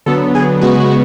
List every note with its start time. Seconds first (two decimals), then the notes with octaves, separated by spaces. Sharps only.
0.06 D3 F#3 B3 A4
0.35 G#4
0.61 C#3 G#3 B3 F#4